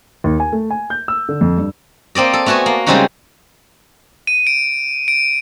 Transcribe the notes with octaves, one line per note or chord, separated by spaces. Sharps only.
D#2
G#5
A3
G#5
G6
E6
D3
F2
G2
A#3 C4 D5 D#5
A4
A3 B3 F#4 G#5 A5
A#3
C#3 G3 G#3 C4 D#4 F#4
D#7
D7
D7